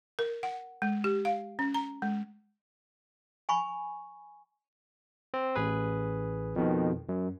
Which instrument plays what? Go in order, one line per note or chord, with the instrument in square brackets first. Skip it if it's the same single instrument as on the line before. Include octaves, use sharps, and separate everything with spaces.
[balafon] A#4
F#5
G#3
G4
F5
C#4
A#5
G#3
[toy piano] G#5 B5 C#6
[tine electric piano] C4
A1 G#4 B4
F2 B2 D#3
F#2